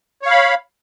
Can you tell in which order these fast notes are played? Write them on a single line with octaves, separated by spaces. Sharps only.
C#5 F5 B5